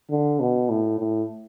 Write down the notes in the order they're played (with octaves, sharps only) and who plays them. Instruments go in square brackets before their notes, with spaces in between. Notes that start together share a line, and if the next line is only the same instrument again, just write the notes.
[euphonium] D3
B2
A2
A2